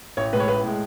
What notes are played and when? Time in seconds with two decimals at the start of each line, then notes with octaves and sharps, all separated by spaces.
0.17 A1 C#5
0.33 A2 G#3 B4
0.40 C#5
0.48 A1 B4
0.64 A2 G#3